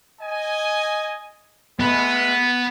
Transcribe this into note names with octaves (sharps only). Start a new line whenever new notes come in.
D#5 G#5
G#3 A3 B3